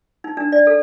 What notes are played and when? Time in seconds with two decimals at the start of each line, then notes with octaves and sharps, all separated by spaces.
0.24 D#4
0.37 D4
0.52 D5
0.67 A4